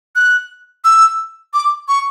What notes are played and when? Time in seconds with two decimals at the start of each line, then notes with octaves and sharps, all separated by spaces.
0.16 F#6
0.85 E6
1.54 D6
1.88 C#6